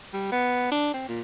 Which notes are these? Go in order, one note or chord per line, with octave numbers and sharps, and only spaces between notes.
G3
B3
D4
C4
A#2